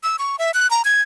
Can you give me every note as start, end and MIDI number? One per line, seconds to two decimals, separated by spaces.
0.03 0.17 88
0.19 0.36 85
0.39 0.51 76
0.54 0.70 90
0.71 0.82 82
0.85 1.02 92